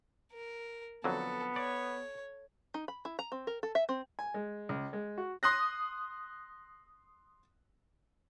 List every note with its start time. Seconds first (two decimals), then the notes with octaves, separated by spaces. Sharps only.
0.32 A#4
1.04 F2 D3 F#3 B3 A4
1.56 C#5 D5
2.74 D#4
2.88 B5
3.05 E4
3.19 A#5
3.32 C4
3.47 A#4
3.63 A4
3.75 E5
3.89 C4
4.19 G#5
4.34 G#3
4.69 C#2
4.93 G#3
5.18 F#4
5.43 C6 D#6 F#6 A#6